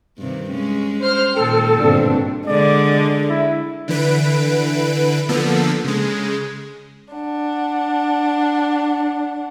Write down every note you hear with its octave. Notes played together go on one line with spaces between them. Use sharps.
G2 C3 D#3
G#3 C#4
C5 F6
A#2 D#3 G#3 A4 G5
G1 G#2 B2 C4 D4
D3 G#3 D5
E4
D3 E3 B4 D7
D3 F3 A#3 B3 A4
C#3 G#3
D4 F#5